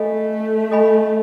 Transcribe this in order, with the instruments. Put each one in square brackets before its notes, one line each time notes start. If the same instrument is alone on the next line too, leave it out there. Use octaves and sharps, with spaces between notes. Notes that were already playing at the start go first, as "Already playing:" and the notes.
Already playing: [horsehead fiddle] A3 [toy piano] A4 D#5 G#5 B5
[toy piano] A4 D#5 G#5 B5